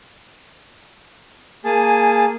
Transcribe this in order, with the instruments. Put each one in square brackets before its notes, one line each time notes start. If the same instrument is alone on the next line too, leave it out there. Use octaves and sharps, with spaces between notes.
[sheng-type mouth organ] A#3 G#4 A5 [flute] G#5